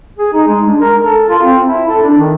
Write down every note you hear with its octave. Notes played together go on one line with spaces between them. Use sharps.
G#4
D#4
G#3
D4
A#4
A4
F4
C4
E4
A4
D4
D#3